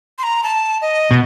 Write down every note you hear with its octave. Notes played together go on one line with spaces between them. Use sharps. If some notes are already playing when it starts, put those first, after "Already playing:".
C6
A#5
A5
D#5
B2